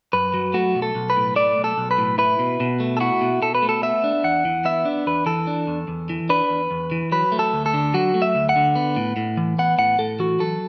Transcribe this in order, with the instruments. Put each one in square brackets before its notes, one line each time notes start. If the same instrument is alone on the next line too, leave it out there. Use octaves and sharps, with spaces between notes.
[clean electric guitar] F#2 B4
F#3
A3 F#4
B1
A4
B1
B4
A2
A3 D5
B1
A4
B1
B4
A2
E4 B4
B2
B2
A3
A4
E4 F#4
B2
B2 A4
B4
A3
A4
B3 E5
D4
E2 F#5
E3
B3 E5
D4
E2 B4
E3 A4
D4
E2
E2
E3
D4 B4
E2
E2
E3
F#3 B4
A3
A4
D2
A4
D3
F#3 F#4
A3
E5
D2
F#5
D3
B3
A2
A2
E3
B3 F#5
A2 F#5
A2 A4
E3 F#4
F#3 A4